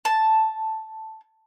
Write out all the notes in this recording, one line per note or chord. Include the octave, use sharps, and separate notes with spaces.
A5